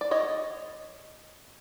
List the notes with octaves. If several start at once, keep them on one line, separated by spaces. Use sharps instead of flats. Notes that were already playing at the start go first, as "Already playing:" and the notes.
D5
C#5 D#5